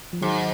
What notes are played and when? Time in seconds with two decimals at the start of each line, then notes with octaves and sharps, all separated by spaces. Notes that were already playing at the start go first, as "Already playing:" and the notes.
0.13 F3
0.21 G#2 D#3 F#3